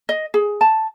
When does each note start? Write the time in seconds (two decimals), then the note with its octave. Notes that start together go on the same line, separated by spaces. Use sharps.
0.09 D#5
0.34 G#4
0.61 A5